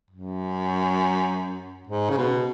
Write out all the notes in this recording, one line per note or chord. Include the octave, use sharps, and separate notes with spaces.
F#2
G#2
C#3
B2